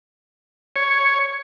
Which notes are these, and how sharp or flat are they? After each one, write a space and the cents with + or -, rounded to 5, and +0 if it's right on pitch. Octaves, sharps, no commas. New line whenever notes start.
C#5 +0